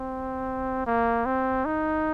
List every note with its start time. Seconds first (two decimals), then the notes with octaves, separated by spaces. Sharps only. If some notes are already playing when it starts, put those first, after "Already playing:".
Already playing: C4
0.87 A#3
1.26 C4
1.65 D#4